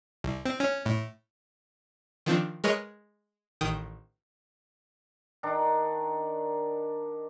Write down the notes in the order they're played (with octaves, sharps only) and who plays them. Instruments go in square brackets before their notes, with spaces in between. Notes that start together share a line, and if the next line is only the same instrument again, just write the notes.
[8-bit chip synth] C2
C4
C#4
A2
[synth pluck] D#3 F3 C4 D4
G#3 A#4 B4 C#5 D#5
A1 D#3 G5 D#6
[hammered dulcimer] D#3 D4